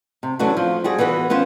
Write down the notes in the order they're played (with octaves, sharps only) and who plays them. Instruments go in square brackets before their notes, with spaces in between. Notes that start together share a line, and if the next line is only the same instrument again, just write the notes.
[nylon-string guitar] C3
D3 E3 F#3 A3 C#4 F#4
F3
G3 F#4 G#4
E3 B3 F#4 B4
B3 C#4 F4 C5